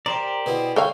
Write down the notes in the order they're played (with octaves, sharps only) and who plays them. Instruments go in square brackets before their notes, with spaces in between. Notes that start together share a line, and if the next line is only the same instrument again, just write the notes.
[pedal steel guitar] G4 C5 D5 [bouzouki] A#4
[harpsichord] B2 B3 E4 [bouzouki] G#4
[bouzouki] D3 [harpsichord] G3 [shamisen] A4 C#5 F5 [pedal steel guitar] G5